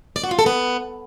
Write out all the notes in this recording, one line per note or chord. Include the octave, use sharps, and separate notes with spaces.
D5
F#4
F4
A4
B3